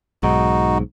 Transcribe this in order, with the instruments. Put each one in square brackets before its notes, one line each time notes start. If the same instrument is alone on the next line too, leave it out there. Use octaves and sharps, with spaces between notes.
[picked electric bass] B1 G#2 [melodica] D#4 F#4